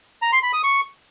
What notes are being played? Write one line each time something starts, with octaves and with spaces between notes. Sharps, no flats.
A#5
C6
B5
D#6
C#6